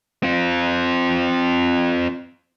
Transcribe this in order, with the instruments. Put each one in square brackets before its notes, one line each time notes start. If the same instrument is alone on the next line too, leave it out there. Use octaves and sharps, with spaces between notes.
[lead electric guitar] C4 F4